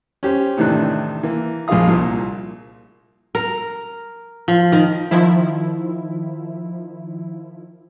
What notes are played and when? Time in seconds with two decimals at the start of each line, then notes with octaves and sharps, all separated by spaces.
0.23 C#4 G4 C5
0.57 A2 C3 D#3 E3 D4 F#6
1.23 E3 A#3
1.68 A#1 A#2 F3 G#4 F5 D#6
1.87 C2 A#2
3.35 A#4
4.48 F3
4.72 D#3
5.11 D#3 F3 E4